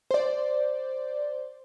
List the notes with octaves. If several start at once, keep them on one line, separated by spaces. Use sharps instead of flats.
C5 D5